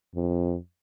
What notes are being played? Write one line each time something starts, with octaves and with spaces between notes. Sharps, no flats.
F2